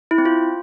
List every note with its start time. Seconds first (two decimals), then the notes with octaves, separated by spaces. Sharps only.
0.11 E4
0.18 C4
0.25 F4